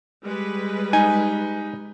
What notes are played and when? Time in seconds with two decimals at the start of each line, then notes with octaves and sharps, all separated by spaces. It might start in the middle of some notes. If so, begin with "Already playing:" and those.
0.23 G3 G#3 B4
0.93 D#4 G#5